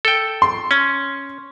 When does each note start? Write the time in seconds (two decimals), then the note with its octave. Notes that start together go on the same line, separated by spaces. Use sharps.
0.05 A4 G5
0.42 C6
0.71 C#4